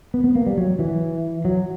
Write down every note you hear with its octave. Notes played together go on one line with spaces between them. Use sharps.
B3
B3
A#3
G3
F#3
E3
F#3